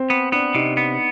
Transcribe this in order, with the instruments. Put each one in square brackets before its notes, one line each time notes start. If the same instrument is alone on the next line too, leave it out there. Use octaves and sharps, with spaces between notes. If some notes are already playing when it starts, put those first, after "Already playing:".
Already playing: [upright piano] C4
[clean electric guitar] B3
[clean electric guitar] B3 [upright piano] D4
[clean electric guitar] C3 [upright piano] D#4
[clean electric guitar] B3